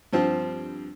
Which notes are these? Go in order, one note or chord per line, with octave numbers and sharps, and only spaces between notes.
G2 F3 C4